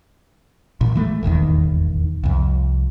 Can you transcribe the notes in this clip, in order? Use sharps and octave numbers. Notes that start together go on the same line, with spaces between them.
A1 A#2
E3 G#3 A3
D#1 G#1 E2 D#3
C2 F2